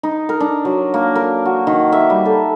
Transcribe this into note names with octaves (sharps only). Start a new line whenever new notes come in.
D#4
A#4
D4
F#3
A#3
A#4
F#4
D#3
E5
G3
A4